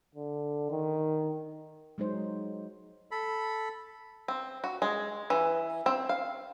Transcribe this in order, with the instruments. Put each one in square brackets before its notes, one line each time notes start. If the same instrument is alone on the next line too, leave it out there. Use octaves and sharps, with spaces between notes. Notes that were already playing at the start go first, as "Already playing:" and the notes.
[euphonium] D3
D#3
[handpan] F#3 G#3 D#4 C5
[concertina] A4 B5
[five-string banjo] C4
F#4
G#3
E3
C4
F5